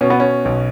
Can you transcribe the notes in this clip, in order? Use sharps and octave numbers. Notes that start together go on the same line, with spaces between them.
B2 C#4
B3
C#4
B1